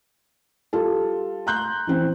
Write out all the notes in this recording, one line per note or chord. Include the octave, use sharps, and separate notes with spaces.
G3 F4 A4
A#5 C6 F#6 G6
E3 C4